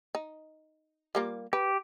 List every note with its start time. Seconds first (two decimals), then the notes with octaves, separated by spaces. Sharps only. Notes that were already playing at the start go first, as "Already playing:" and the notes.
0.15 D#4
1.15 G3 A#3 F4
1.53 G4 B4